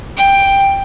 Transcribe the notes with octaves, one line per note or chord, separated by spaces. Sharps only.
G5